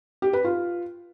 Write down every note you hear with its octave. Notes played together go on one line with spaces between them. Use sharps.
G4
B4
F4